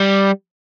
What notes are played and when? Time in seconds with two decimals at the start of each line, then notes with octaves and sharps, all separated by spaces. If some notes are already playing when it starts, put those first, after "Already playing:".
Already playing: G3